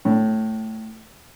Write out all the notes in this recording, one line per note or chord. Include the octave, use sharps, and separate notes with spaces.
A2